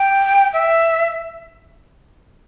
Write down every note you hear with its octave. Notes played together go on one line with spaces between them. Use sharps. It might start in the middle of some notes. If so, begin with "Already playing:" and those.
Already playing: G5
E5